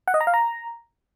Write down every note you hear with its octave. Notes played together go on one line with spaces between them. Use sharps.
F#5
D#5
A#5
F5
A#5